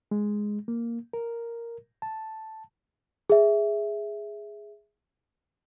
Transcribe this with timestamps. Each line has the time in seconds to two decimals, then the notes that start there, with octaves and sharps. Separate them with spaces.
0.11 G#3
0.68 A#3
1.13 A#4
2.02 A5
3.30 G#4 E5